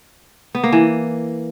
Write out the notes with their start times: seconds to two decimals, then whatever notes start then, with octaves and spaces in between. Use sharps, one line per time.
0.55 B3
0.64 A#3
0.72 E3